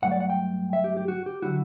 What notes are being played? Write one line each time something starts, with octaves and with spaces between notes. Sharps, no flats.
G2 F#3 A3 F#5
D5
F#5
G5
E5
G4
G4
F#4
G4
D3 F#3 C4 E4 F#4